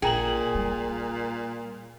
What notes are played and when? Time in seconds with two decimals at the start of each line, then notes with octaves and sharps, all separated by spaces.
0.02 A#1 A#2 G#4 G5 A#5 F#7
0.55 G3